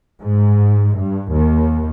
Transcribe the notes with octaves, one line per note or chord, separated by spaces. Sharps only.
G#2
G2
D#2